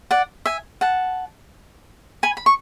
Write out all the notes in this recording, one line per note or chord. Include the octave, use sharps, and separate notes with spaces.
D5 F#5
E5 G#5
F#5 A5
G#5 B5
B5
C#6